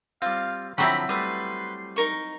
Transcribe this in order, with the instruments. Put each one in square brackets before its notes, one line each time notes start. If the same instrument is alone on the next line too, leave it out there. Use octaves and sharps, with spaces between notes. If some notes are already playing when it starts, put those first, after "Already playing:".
[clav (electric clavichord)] G3 C4 [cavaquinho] F4 [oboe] F5
[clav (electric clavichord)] D3 F3 [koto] F#3 C4 E4 [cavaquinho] G5 A#5 [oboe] B5
[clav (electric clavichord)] G3 A3 [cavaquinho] B4 D#6 [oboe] C6
[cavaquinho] D#4 A#4 C#6